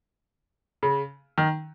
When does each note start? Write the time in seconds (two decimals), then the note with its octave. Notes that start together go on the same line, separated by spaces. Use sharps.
0.83 C#3
1.38 D#3